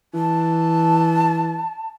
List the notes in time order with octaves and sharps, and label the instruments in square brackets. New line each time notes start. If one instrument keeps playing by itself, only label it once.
[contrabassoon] E3 [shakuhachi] A5